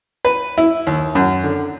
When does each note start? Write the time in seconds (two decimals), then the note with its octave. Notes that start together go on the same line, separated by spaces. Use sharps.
0.25 B4
0.58 E4
0.87 D#2
1.15 F#2
1.44 D3